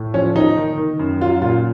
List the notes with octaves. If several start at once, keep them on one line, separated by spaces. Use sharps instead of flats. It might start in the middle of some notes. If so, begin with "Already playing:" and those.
Already playing: A2
F3 C#4
D#3 D#4
D#3
D#3
F#2
F#3 F4
A#2 F4